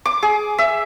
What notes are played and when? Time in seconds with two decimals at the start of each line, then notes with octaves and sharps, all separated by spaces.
0.06 D6
0.22 G#4
0.58 E5